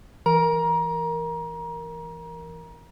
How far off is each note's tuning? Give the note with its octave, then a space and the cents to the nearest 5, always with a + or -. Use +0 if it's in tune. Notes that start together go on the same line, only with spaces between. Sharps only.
E3 +0 A#4 +0 A#5 +30